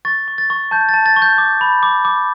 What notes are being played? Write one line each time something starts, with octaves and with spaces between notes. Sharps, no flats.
C#6 A6
C#6
A6
C#6
A5 G6
A6
A5
A6
C#6
G6
D6
B5
D6
D6